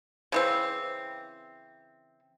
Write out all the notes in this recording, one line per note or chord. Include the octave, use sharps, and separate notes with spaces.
C#3 E3 C4